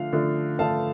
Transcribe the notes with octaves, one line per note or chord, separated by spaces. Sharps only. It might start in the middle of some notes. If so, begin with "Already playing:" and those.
Already playing: D3 F3 A3 F5
D3 F3 A3
D3 F3 A3 F5 A5